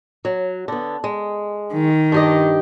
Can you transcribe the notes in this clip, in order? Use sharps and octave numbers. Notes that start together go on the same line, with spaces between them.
F#3
D3 B3
G#3
D#3
G2 G4 D#5